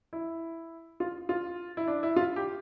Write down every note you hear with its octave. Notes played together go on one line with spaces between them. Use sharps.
E4
F4
F4
E4
D4
E4
F4
G4